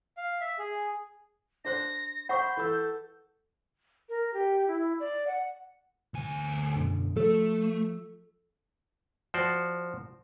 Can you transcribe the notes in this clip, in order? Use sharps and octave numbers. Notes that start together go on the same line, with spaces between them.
F5
E5
G#4
D4 C5 F#6 A#6
C5 F#5 B5 C#6 G6
E3 A4 E6
A#4
G4
E4
D5
F#5
D2 G#5
F#2 B2 D3
F3 A3 A4
F3 F#4 C5 D5